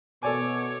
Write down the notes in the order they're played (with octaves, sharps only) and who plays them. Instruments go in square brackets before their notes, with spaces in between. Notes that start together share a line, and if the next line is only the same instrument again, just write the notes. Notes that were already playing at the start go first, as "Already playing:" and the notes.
[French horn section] B2 [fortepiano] A4 D5 G#5 [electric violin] C#5 D6